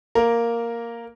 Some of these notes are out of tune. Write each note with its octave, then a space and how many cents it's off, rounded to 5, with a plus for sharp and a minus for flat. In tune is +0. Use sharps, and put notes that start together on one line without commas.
A#3 +0 A#4 +0